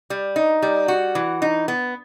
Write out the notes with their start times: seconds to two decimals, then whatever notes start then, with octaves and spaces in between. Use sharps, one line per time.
0.10 G3
0.36 D#4
0.62 G3
0.88 F#4
1.15 E3
1.42 D#4
1.68 B3